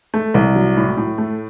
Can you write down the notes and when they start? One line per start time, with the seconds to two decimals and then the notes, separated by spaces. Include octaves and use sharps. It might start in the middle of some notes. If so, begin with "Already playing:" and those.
0.14 A3
0.34 C2
0.56 F#3
0.76 A2
0.97 A2
1.18 A3